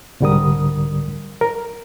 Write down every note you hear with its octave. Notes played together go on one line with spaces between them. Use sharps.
C2 G#2 D3 G3 A#4 D#6
A#4